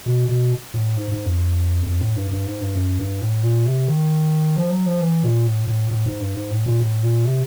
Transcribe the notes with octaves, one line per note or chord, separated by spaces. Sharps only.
B2
B2
A2
G#2
G#2
F2
F2
A2
G2
G2
G#2
G2
F#2
G2
A2
A#2
C3
D#3
F3
F#3
F3
E3
A#2
A2
A2
A2
G#2
G2
G#2
A2
A#2
A2
A#2
C3